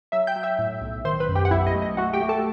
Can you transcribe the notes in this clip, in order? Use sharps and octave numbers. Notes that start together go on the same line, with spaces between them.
F#3 E5 E6
G5 G6
F#3
E5 E6
A2
B1
D#3 C5 C6
B4 B5
F#2
G4 G5
F#5
B1 E4 E5
D#5
A3
D#5
A3 F#4 F#5
G4 G5
A3
A4 A5